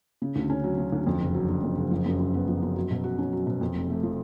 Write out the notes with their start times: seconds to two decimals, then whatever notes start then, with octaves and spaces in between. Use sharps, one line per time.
0.22 C#3
0.36 D2
0.50 C#4
0.64 F#3
0.78 C#3
0.93 D2
1.07 F2
1.20 F#1
1.34 F#3
1.49 D3
1.63 F2
1.78 F#1
1.91 F3
2.05 F#2
2.20 F#2
2.34 B3
2.48 F3
2.62 F#2
2.76 F#3
2.91 B2
3.04 F#4
3.19 C#4
3.33 F#3
3.47 B2
3.61 F2
3.75 F1
3.90 A3
4.03 F3